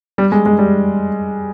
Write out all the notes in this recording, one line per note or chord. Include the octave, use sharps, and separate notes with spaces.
G3
G#3
G#3
G3